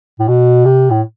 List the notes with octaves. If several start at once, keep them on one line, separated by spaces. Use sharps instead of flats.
A2
B2
C3
A2